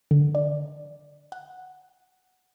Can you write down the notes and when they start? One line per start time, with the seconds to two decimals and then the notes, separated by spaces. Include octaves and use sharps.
0.11 D3
0.35 D5
1.32 F#5